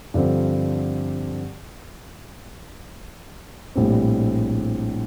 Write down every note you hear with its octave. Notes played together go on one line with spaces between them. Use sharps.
G2 D3 F3 C4
A#1 A2 G3 C4